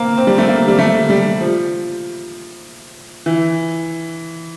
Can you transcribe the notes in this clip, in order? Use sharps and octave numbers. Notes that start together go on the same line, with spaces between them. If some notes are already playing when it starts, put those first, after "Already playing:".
Already playing: A#3 C4
C4
G3
A3
A#3
G3
A3
G3
F3
E3